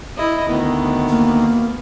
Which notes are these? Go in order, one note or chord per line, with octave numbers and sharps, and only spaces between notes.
E4 D#5
D2 D#3 B3
A#3